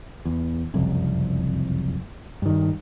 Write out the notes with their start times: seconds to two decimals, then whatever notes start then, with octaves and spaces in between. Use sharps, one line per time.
0.25 E2
0.74 F#1 C2 F2
2.42 G2 D#3